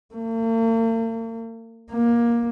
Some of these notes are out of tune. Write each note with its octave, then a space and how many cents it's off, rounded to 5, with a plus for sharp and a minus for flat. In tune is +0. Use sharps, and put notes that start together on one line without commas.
A#3 -45
A#3 +15